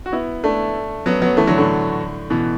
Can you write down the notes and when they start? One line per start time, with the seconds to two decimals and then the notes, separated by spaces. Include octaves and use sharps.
0.06 F#4
0.12 B3 E4
0.44 A3 D4
1.06 F#3 B3
1.22 F#3 B3
1.37 E3 A3
1.47 D3 F#3
1.58 A2 D3
2.30 B2 E3